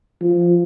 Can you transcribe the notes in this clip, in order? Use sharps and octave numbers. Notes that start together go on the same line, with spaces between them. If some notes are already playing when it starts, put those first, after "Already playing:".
F3